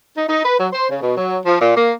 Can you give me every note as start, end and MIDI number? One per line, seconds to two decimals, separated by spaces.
0.16 0.28 63
0.29 0.41 63
0.44 0.58 71
0.59 0.67 54
0.73 0.89 72
0.91 1.00 49
1.02 1.16 47
1.17 1.39 54
1.45 1.59 53
1.60 1.74 46
1.75 1.93 58